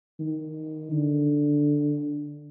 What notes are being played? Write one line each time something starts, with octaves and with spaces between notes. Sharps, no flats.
D#3
D3